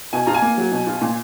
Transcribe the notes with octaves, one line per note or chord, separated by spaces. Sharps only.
B2 G#5
F4 A#5
G#5
A#3
F#3
B2
F4
A#2